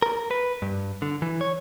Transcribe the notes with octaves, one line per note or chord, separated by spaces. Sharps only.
A#4
B4
G2
D3
E3
C#5